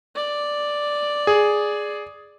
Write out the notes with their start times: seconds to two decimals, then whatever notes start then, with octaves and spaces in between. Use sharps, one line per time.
0.16 D5
1.27 G#4